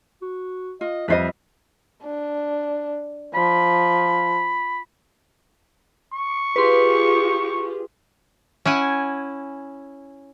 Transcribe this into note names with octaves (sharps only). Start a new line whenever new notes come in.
F#4
F4 D#5
F2 F3 G3 B4 C5 D#5 E5
D4
F3 B5
C#6
F4 G4 G#4 B4 C6
C#4 E4 F#5 G#5